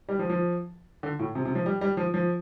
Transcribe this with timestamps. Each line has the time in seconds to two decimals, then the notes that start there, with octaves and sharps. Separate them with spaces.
0.09 G3
0.19 F3
0.30 F3
1.03 D3
1.19 A2
1.35 C3
1.45 C3
1.55 F3
1.66 G3
1.81 G3
1.97 F3
2.14 F3